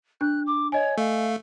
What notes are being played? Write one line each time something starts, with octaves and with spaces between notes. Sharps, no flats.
D4 F#6
D6
C#5 D#5 G#5
A3 F5